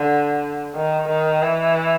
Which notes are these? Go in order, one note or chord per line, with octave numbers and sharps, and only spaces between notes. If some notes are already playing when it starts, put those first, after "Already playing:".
Already playing: D3
D#3
D#3
E3